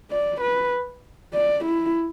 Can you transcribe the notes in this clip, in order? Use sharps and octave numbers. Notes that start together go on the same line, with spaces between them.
D5
B4
D5
E4